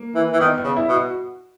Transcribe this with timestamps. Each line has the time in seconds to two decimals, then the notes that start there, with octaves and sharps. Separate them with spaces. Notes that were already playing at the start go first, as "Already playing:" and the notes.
Already playing: A#3
0.15 E3
0.33 E3
0.40 D#3 B3
0.58 B3
0.64 C#3
0.76 E4
0.89 B2
0.95 F#4